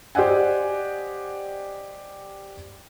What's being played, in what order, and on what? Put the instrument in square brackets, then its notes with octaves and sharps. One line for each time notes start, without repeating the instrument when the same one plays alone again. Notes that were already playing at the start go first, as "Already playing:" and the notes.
[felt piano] G4 C5 D5 D#5 F#5 G#5